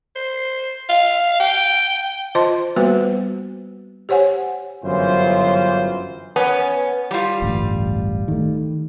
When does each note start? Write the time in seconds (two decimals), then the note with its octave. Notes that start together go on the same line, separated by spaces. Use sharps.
0.16 C5
0.89 F5
1.40 G5
2.35 F4 C5 D#5 A5 C6
2.76 G3 A#3 B3 F#4 B4 C5
4.09 G4 C5 C#5 F#5 G#5
4.84 G1 F#2 E3 F4 C5
6.36 B3 C#4
7.11 G3 F4
7.42 D1 A1 G2
8.28 D#3 A3